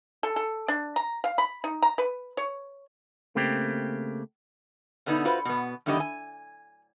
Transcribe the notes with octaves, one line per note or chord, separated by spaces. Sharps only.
A4
A4
D4
A#5
F5
B5
D#4
A#5
B4
C#5
C#3 A3 A#3 C4 G4
B2 D3 B3 C#4 D#4
F4 F#4 B4 C5
B2 B3
E2 G2 D3 D#3 G4 D#5
G#5